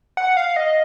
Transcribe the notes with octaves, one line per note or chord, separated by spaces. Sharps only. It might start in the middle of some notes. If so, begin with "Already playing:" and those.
F#5
F5
D#5